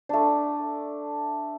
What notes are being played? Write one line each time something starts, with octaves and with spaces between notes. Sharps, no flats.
A3 D4